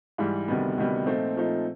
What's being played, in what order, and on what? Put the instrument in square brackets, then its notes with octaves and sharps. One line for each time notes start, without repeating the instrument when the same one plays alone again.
[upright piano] G#2 E3 G3
D2 C3 D#3 G3 B3
D2 C3 D#3 G3 B3
A#2 F3 A3 C4 D#4
A#2 F3 A3 C4 D#4